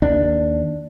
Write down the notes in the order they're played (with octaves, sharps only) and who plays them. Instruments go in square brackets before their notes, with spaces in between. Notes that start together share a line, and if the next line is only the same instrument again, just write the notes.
[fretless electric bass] D#2 D4